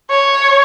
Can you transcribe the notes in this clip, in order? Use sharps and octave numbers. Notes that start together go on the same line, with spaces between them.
C#5